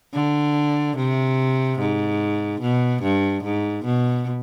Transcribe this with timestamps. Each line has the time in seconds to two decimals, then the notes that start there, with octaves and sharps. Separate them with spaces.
0.14 D3
0.97 C3
1.79 G#2
2.61 B2
3.03 G2
3.44 G#2
3.85 B2